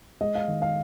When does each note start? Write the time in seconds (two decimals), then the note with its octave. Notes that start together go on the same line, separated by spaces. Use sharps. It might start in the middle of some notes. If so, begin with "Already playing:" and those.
0.21 G#3 D#5
0.35 F5
0.48 D#3
0.62 F5